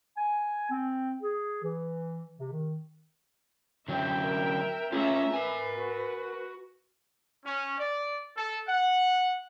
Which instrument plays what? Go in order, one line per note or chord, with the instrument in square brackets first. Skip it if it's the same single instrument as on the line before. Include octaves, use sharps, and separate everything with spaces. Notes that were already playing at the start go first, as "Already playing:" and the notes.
[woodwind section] G#5
C4
G#4
E3
C3
D#3
[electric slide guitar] D3 F#3 C#4 [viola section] E5 G5
[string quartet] A#4
[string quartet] A3 C#4 A#5 [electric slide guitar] F4 G#4 [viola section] E5
[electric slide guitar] A#4 G#5 [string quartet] B4
[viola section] F#4
[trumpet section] C#4
D5
A4
F#5